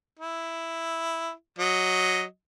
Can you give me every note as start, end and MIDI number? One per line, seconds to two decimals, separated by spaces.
0.19 1.32 64
1.58 2.23 54
1.58 2.23 75